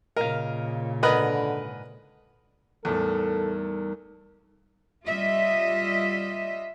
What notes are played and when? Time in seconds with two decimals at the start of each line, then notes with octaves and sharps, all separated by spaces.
0.16 A#2 C#3 A#4 D#5 F5
1.03 G#2 D3 A#4 B4 D#5 F#5 B5
2.85 E2 A2 G3 D#4 A4 A#4
5.06 G3 F4 D#5 E5